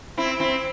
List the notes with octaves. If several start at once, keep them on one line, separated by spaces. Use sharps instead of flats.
C4 E4
C4 E4